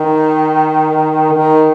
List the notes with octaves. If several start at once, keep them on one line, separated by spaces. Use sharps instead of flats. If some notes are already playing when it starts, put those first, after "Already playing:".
Already playing: D#3
D#3